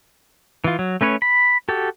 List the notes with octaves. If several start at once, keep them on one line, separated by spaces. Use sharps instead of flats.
E3 F4
F#3
A3 C#4 B4 C#5
B5
F#4 G4 A4